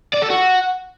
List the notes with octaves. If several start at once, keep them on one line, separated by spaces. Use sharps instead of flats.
D5
A4
F#4